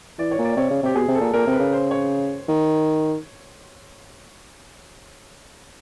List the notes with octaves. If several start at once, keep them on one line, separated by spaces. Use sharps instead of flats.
E3 D5
C#5
A#2
D5
C3 C#5
C#3
C3 G4
B2 G#4
C3
A4
A#2
A#2 A#4
C3
B4
C#3
C5
C#5
D#3